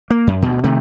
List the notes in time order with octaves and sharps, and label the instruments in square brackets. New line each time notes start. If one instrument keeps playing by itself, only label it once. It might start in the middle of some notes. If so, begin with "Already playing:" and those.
[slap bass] A#3
F#2
D2 B2
C3 D#3 A3